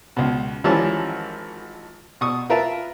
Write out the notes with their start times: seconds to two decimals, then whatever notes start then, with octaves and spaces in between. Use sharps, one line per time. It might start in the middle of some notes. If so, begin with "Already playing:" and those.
0.17 C#2 B2
0.64 G#1 E3 F3 G3 C#4 A5
2.21 B2 C#6 D#6
2.49 F4 A#4 B4 E5 A5